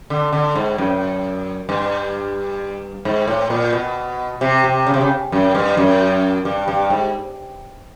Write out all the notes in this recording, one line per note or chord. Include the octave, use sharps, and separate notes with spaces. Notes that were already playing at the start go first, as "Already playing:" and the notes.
D3
D3
G#2
F#2
G2
G#2
A2
A#2
B2
C3
C3
C#3
C3
C#3
F#2
G2
F#2
G2
G2
G#2